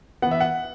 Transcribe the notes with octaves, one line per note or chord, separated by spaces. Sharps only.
E3 B3 E5 F#5
F#5